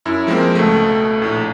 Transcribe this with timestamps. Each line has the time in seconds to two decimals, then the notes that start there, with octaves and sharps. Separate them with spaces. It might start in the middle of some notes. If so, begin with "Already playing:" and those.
0.05 F#2 E4
0.27 F3 G#3 A#3 C4
0.55 C#2 B2 A3
1.22 A#1 A2